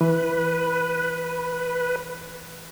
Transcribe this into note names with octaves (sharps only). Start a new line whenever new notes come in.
E3 B4